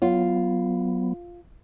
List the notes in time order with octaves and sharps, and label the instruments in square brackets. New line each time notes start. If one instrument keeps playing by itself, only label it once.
[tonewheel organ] F#3 B3 [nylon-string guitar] F4